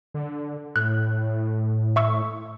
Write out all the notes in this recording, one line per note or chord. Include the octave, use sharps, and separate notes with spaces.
D3
A2 F#6
E5 C#6 E6